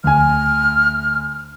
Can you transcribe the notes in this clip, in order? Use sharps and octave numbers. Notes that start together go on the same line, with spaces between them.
D2 G#5 F6